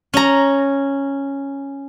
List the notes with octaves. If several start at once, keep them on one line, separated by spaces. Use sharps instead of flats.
C#4 A#5